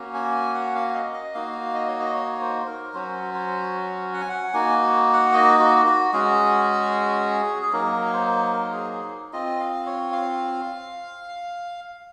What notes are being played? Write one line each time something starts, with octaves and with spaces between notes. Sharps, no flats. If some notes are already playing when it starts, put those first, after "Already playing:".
Already playing: A#3 C#4 F#4
G#5
F#5
F5
D#5
D#5
A#3 D#4 F#4 F5
D#5
C#5
D#5
C#5
C5
C5
A#4
F#3 C#4 F#4 C5
C5
F#5
G#5
F#5
A#3 D#4 F#4 G#5
F#5
D#5
F#4
F#4
G#3 C#4 F#4 G#4
G#4
F#3 A#3 D#4 A#4
C5
A#4
G#4
G#4
C4 F4 D#5
F5
C#5
F5